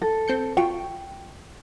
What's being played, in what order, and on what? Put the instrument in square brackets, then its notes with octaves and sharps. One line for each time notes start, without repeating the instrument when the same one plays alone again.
[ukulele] A4
[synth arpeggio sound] C4 G6 C#7
[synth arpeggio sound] F4 F#4 C#6 [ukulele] G5